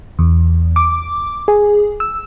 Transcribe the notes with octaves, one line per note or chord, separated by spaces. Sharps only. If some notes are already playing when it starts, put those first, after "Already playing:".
E2
D6
G#4
E6